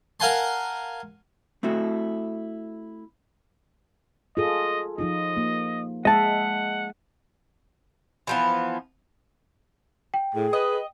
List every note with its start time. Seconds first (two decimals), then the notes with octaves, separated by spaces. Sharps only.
0.20 A#4 F5 F#5 G#5 A5 C6
1.63 A3 C4 E4 F#4 A4
4.37 F4 G#4 A4 D#5
4.98 F3 D#4 F4 D#5
5.37 A#3
6.05 G#3 D#5 E5 F#5 A5
8.27 E3 F3 B3
10.14 G5
10.34 A2 G#4
10.53 B4 D#5